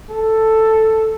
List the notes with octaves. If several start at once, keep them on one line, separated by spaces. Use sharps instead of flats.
A4